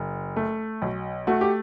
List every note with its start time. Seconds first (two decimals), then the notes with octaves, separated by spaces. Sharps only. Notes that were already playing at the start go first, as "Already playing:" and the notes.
Already playing: F#1
0.36 A3
0.82 B1
1.27 A3 F#4
1.41 G4